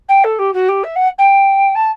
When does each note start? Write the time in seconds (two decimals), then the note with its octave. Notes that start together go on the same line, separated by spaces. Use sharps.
0.08 G5
0.23 A4
0.38 G4
0.53 F#4
0.68 G4
0.83 E5
0.95 F#5
1.18 G5
1.75 A5